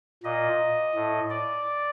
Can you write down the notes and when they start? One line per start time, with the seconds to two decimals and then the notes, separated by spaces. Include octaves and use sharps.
0.23 A#2 D#5
0.95 A2
1.30 D5